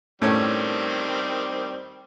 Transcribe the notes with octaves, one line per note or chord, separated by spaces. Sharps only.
A2 D#3 G3 A3 C4 C#4